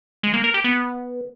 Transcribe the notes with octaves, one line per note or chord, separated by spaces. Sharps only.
G#3
A#3
A#4
G4
B3